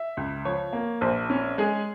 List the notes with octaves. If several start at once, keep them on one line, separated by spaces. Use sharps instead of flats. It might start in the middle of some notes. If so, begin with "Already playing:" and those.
Already playing: E5
C#2
F3 C#5
A#3
A#1 C5
C#4
G#3 G#4